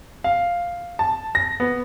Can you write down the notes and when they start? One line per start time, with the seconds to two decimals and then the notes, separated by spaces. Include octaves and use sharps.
0.24 F5
0.99 A5
1.35 A#6
1.60 B3